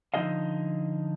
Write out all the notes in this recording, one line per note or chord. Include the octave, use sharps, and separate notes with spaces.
D3 F3 D#4 G#4 D#5 F5